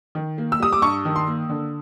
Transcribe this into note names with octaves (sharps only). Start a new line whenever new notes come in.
D#3
A#3
E6
G3 D#6
D6
G2 C#6
D#3
C6
A#3
D3